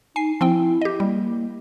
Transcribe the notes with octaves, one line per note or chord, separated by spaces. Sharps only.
D#4 G#5 C7
F3 C4 E4 G5
G4 D#5
G3 A#3